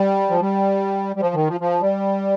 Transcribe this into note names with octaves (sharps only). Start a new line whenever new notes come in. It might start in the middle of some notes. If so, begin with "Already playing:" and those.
Already playing: G3
F3
G3
G3
F3
D#3
F3
F3
G3